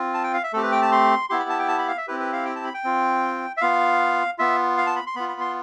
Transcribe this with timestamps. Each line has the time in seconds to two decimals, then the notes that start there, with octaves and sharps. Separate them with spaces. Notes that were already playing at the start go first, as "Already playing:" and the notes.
Already playing: C4 F4
0.14 A5
0.24 G5
0.34 F5
0.43 E5
0.53 A3 C4 G4 A4
0.63 B4
0.72 G5
0.82 A5
0.92 C6
1.30 B3 E4 G4 C6
1.39 B5
1.49 A5
1.59 G5
1.68 A5
1.78 B5
1.88 F5
1.98 E5
2.07 C4 E4 G4 B4
2.20 B4
2.33 F5
2.45 G5
2.56 A5
2.65 B5
2.74 G5
2.84 C4 F4
3.57 E5
3.61 B3 F4 F5
4.39 B3 F4 E5
4.78 F5
4.86 A5
4.96 B5
5.07 C6
5.15 B3 B5
5.20 F4
5.29 B5
5.41 C6